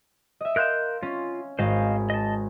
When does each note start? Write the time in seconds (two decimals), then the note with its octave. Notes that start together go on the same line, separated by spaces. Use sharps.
0.41 D#5 E5
0.56 A#4 F5 C6 F#6 G6 E7
1.03 C#4 F4
1.59 G#1 C5 D#5 F5
2.10 D#5 A5